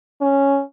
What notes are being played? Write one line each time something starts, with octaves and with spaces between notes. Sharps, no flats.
C#4